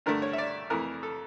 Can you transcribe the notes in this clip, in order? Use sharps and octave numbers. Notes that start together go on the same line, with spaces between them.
G2 D3 A3 A#4
C#5
E5
D5
F2 E3 A3 A#4
A4